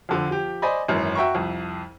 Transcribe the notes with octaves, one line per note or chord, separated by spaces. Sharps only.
F2 D3 F3
F3 G4
C5 D5 D#5 G#5 B5
G#1 F#2 E3
F#4 E5 G5 A#5 C#6
C2 F2